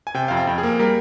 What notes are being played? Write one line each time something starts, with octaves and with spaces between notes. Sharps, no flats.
G#5
C3 G5
F2 F5
G5
F2
G#4
A#3
G3 A#4